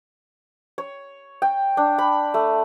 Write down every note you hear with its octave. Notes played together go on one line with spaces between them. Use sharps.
C#5
G5
D4
B5
A3